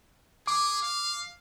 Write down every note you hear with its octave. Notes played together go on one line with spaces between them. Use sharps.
G#4 D6
F5